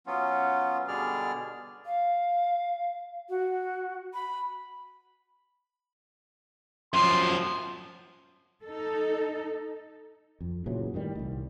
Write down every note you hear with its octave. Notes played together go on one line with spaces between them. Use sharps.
F#3 B3 C#4 F4
B2 D3 G3 G#4 D5 F6
F5
F#4
B5
F#2 F3 C6
D#4 A4
F2
A#2 C#3 E3 F#3
A2 D#3 F#3 G3
D1 C2